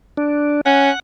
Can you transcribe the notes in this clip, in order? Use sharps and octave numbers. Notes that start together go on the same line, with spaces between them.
D4
C#4 F#5